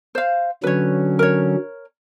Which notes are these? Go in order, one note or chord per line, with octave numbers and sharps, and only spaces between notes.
C5 F5
D3 F#3 C#4 B4 C#5
A#4 C#5